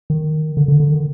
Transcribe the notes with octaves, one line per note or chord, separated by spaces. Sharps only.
D#3
D3
D3
D3
D#3